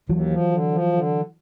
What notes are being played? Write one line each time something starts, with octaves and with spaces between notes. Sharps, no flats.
D#2 E3 F#3
F3
D3
F3
D3